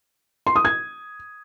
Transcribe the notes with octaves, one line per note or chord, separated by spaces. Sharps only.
C6
D#6
G#6